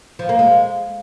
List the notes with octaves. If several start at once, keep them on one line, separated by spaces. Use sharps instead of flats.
F3
A#3
G#3